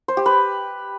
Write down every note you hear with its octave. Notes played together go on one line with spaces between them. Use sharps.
C5
G4
B4